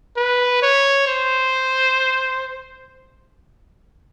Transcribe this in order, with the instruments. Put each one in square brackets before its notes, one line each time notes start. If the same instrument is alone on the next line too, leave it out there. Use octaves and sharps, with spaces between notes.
[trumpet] B4
C#5
C5